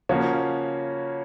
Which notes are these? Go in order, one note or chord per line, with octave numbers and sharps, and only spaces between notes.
C#3 F3 A#3 C#4 F#4